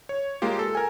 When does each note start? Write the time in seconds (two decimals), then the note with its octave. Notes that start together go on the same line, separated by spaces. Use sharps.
0.09 C#5
0.42 G#3 A#3 F4 G4
0.59 A4
0.75 A#4 G#5